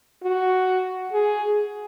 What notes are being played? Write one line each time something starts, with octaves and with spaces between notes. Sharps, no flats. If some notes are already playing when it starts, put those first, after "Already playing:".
F#4
G#4